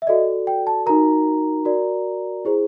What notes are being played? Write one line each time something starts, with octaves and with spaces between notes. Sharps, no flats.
E5
F#4 A4 D5 D#5
G5
A5
D#4 F#4 A#4 A#5
F#4 A#4 D5
E4 G#4 C5